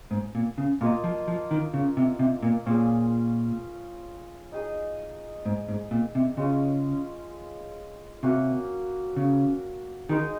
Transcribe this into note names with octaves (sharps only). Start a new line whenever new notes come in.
G#2
A#2
C#3
A#2 A#3 F4 A#4 D#5
F3
F3
D#3
C#3
C3
C3
A#2
A#2 C#4 F4 G#4
D#4 G#4 D#5
G#2
G#2
A#2
C3
C#3 G#3 C#4 F4
C3 A#3 C#4 F#4
C#3
D#3 G#3 D#4 G#4